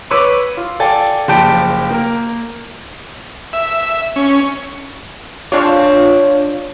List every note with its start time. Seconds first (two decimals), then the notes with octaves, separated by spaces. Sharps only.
0.11 B4 C#5 B5 C#6 D6 E6
0.57 F4
0.80 A4 D5 F5 G5 G#5 A6
1.28 F#1 F3 G4 A5 G6 D7
1.91 A#3 A#4
3.53 E5
4.16 C#4
5.52 C4 D4 F4 C#5